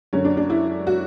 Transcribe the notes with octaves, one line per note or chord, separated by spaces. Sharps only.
F#2 D3 C#4
D4
D4
E4
F#4